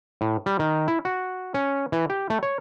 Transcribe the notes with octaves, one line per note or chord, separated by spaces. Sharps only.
A2
G3
D#3
E4
F#4
C#4
E3
G4
A3
C#5